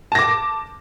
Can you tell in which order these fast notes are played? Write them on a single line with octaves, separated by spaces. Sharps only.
A5 A#6 D6